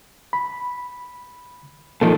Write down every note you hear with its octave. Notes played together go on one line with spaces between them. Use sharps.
B5
A#2 D#3 F3 A4